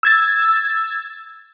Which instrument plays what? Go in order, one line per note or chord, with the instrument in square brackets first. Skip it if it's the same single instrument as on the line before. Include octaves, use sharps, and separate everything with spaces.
[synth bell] E6 G#6 A6